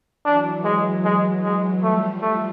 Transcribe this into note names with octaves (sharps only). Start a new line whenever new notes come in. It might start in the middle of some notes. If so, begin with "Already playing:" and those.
E3 F#3 D4
G#3
G#3
G#3
F3 G3 A3
A3